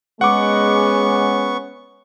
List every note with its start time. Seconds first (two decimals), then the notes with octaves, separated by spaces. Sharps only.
0.21 G#3 B3 C#4 F#5 C#6 D6